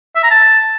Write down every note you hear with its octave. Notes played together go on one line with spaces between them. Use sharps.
E5
A#5
A5